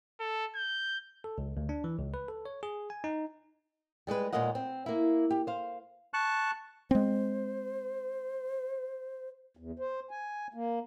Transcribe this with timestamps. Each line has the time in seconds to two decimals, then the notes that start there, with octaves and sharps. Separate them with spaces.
0.19 A4
0.55 G6
1.24 A4
1.38 C#2
1.57 D2
1.69 D4
1.84 E3
1.98 C#2
2.14 B4
2.28 A4
2.45 C#5
2.63 G#4
2.90 G#5
3.04 D#4
4.07 G3 G#3 G#4 B4
4.33 D#2 A#2 G#3 A#3 D#5 F#5
4.55 C4
4.86 A#3 E4
5.31 G4
5.47 C5 F5
6.14 A5 C#6 F#6
6.91 G#3 C4 C5
9.57 E2
9.79 C5
10.11 G#5
10.54 A#3